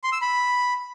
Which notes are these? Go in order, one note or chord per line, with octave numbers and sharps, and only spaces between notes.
C6
E6
B5